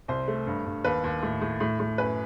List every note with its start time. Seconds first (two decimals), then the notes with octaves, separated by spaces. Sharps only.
0.08 C2 C5
0.28 A3
0.47 G2
0.65 G2
0.84 D#2 B4
1.04 D#2
1.23 A2
1.41 A2
1.60 A2
1.79 A2
1.98 F#2 B4